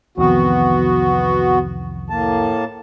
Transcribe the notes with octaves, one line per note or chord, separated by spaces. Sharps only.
C2 F2 C3 D#3 E3 B3 F#4
A2 A#3 A5